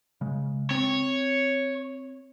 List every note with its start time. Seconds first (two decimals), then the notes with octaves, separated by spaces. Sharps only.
0.21 C#3 G#3
0.71 C4 C#5